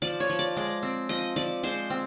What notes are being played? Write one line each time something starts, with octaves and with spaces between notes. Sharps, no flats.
F3 D5
C#5
F3
D5
G#3 D5
C4
F3 D#5
F3 D5
G#3 C5
C4